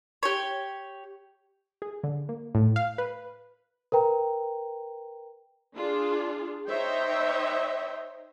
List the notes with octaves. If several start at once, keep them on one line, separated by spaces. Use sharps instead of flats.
G4 C#5
G#4
D3
A#3
A2
F5
B4
A#4 B4 G5 A#5
D4 F4 G#4
D#4 C5 C#5 D#5 E5 G5